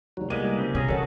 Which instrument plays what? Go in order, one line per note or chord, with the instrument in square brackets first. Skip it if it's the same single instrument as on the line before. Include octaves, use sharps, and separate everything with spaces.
[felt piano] F1 D#2 [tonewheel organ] F#3
[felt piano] C2 D#7 [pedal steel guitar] G3 G#3 B3 [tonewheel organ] A#3
[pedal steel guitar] C#3 C4
[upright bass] C3 [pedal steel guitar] C#4 G#4 A#5
[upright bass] D3 E3 [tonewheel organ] F#4 A4 [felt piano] A#4 C#5 F#5